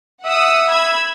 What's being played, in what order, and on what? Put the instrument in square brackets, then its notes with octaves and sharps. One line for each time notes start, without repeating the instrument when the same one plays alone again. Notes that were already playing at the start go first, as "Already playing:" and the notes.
[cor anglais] E5 [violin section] F#5 D#6 E6
[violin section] B5 E6 G#6